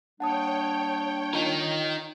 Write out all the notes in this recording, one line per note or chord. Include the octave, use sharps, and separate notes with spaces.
G3 A#3 D4 C#5 F#5 G5 A5 D#6
D#4 F4 A#4